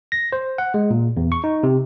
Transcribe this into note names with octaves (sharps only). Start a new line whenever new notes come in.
A#6
C5
F#5
G#3
A#2
E2
C#6
D#4
C3